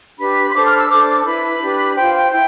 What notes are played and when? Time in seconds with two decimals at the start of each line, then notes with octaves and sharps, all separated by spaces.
0.18 D4 G4 B4 B5
0.50 C6
0.53 D4 A4 C5 D6
0.66 F6
0.77 E6
0.89 D4 A4 C5 D6
1.07 D6
1.24 E4 B4 B5
1.60 D4 G4 B4
1.96 F4 C5 G5
2.13 G5
2.32 E4 G5